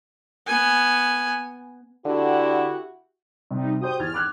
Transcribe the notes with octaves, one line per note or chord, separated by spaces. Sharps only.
B3 G#5
D3 E4 F#4 G4
C3 G3 D#4
F#4 G4 C5 D#6 G6
E2 F6 G#6 A6
D6 F#6 G#6